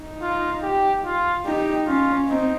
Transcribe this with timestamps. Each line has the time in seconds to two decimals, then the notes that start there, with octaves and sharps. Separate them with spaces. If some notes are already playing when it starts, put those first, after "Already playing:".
Already playing: D#4
0.21 F4
0.62 G4
1.04 F4
1.45 D#4 G4
1.86 C#4 F4
2.28 C4 D#4